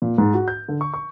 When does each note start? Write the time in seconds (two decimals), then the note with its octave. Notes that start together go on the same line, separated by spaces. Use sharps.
0.02 A#2
0.18 G#2
0.34 F#4
0.48 G6
0.68 D3
0.81 C#6
0.94 C#6